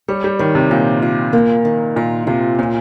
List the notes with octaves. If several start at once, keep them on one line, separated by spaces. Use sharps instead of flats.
G3 C#5
G3
D#3 C#5
C3
A#2 F4
F4
A#3
D#3
A#2 F4
C3 F4
A#2 C#4